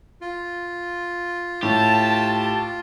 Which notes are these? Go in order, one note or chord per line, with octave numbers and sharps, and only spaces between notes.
F4
A2 G4 A5